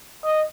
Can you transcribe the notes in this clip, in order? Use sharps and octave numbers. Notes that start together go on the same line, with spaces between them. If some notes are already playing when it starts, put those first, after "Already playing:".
D#5